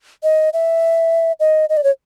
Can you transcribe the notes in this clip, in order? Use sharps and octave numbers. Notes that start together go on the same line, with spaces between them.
D#5
E5
D#5
D#5
D5
C#5